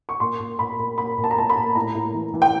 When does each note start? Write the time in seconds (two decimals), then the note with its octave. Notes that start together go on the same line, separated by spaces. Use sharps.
0.09 C#6
0.20 A#2 C6
0.40 A#2
0.59 A#2 B5
0.79 A#2
0.98 A#2 B5
1.18 A#2
1.24 A5
1.31 A#5
1.37 A#2 A5
1.50 B5
1.56 A#2
1.75 A2 A#5
1.95 A2
2.14 E3
2.34 E3
2.42 G5